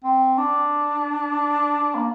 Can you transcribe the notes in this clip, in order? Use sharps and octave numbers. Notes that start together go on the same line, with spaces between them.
C4
D4
A#3